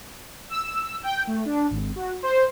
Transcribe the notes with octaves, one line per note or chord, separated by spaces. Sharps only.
E6
G5
A3
D4
G#1
F#4
C5